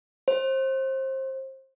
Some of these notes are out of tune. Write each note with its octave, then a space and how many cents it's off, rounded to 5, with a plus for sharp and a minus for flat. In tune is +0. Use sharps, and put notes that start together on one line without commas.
C5 +25